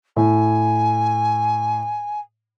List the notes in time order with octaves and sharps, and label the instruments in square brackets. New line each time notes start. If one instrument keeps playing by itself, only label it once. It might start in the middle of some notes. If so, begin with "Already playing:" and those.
[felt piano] A2 [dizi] G#5